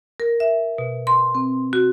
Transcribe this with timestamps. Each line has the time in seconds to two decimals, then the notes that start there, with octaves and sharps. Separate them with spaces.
0.20 A#4
0.40 E5
0.78 B2
1.07 C6
1.35 C4
1.73 F#4